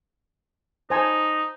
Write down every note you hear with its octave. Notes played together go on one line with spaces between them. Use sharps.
D#4 C5 G#5 A5